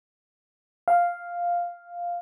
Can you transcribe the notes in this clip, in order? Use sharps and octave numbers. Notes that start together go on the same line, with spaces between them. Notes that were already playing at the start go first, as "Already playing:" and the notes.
F5